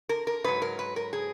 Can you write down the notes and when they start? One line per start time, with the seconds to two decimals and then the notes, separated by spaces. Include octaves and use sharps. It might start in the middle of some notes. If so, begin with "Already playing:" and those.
0.09 A#4
0.27 A#4
0.44 G#2 F#3 B4
0.62 A#4
0.79 B4
0.96 A#4
1.13 G#4